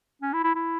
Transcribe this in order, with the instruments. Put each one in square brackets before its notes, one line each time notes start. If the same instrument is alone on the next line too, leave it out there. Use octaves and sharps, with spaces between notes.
[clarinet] C#4
E4
E4
E4